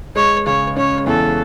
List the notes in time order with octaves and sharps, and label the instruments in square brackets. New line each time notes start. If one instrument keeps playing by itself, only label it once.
[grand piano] G#3 [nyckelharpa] C#5
[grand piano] C#3 [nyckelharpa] C#5
[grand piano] C#4 [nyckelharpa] C#5
[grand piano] E2 [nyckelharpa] A4